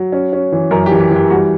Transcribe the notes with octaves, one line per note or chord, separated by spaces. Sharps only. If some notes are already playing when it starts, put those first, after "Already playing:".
Already playing: F#3
C#4
C#4
E3
F#2 A#4
G4
E3
G4
E3
G4
G3 F#4